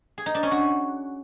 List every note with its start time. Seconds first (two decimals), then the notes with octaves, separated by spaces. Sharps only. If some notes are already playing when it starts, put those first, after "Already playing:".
0.18 G#4
0.26 D#4
0.35 D4
0.43 C#4
0.51 F#4